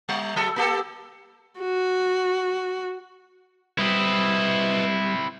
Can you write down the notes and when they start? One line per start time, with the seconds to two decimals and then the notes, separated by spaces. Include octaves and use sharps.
0.09 G3
0.36 F#3 A4
0.56 A#3 G4 A4
1.60 F#4
3.79 G3 C4 E4 B4 D#5